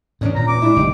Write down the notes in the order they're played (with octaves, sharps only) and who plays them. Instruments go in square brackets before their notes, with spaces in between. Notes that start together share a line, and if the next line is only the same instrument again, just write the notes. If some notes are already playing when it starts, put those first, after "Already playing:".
[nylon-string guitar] E2 C#4 D4 [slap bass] G#2 D#3
[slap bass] A#2 [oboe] A#5
[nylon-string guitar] E2 [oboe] D6
[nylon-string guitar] G#3 D4 E4
[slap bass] F#1 [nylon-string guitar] G2 D#4 G4